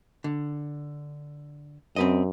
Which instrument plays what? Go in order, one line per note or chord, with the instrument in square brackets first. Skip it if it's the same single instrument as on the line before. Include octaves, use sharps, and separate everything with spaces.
[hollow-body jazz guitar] D3
[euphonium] F#2 [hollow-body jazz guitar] C4 B4 D#5